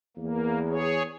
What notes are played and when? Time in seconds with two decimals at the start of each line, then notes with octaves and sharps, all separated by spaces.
0.17 E2 A#3
0.69 G#4 C#5